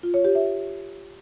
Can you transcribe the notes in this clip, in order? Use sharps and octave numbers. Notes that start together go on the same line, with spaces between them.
F4
C#5
G4
E5